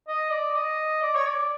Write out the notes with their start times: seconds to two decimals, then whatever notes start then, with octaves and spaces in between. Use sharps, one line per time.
0.08 D#5
0.31 D5
0.55 D#5
1.02 D5
1.15 C#5
1.29 D5